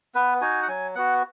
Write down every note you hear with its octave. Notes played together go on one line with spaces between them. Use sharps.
B3 B4
D#4 F#4 G#5
F#5
F#3 G#5
B3 F#4 F#5